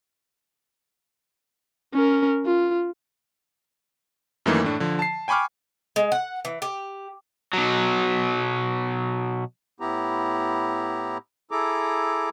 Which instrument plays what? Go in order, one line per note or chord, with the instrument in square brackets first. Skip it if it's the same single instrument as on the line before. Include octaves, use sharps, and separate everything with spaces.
[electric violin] C#4 A#4
F4
[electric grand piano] F#2 D#3 E3 A3 A#3 D#4
A2 A3 D4
D3 F3
A5 C7
G5 G#5 B5 C#6 D6 F6
[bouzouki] G#3
F#5
E3
G4
[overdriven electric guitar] B2 F#3
[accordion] A2 B3 E4 G4 A#5
E4 G#4 A4 A#5 D6